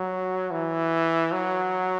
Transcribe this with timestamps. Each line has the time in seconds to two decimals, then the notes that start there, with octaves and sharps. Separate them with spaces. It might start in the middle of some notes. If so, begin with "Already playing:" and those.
Already playing: F#3
0.51 E3
1.33 F#3